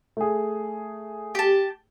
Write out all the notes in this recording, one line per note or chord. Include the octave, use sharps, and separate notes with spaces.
A3 G#4
G4 A5